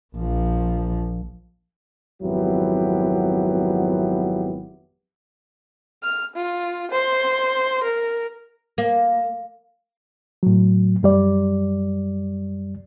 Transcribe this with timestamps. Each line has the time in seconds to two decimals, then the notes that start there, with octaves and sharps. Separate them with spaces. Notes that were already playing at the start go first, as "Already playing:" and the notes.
0.16 A#1 F3
2.22 G#1 F2 F#3 B3 E4 G4
6.03 F6
6.36 F4
6.91 C5
7.83 A#4
8.78 A#3
10.43 A2 F#3
11.03 F#2 G3 D5